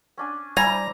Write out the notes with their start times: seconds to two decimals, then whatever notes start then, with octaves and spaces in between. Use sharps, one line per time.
0.18 C#4 D4 G#5
0.57 G3 E4 C5 G#5 A#5